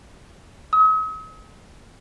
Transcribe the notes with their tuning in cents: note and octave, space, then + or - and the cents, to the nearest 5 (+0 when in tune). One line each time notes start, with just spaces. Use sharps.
D#6 +45